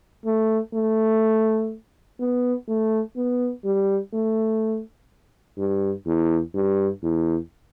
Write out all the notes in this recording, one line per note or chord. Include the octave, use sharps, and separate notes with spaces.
A3
A3
B3
A3
B3
G3
A3
G2
E2
G2
E2